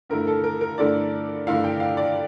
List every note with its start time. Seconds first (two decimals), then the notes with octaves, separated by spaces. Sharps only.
0.10 G2 D3 A3 E4 A#4
0.27 A4
0.44 A#4
0.61 A#4
0.78 G2 D3 A3 E4 D5
1.47 G2 D3 A3 E4 F5
1.64 G5
1.80 F5
1.97 D5